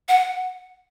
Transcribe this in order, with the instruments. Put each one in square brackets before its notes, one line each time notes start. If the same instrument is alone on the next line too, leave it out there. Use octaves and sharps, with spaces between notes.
[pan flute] F#5